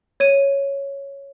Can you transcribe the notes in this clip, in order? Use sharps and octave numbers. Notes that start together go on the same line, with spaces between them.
C#5 D#7